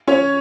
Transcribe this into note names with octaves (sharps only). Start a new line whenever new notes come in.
C#4 C#5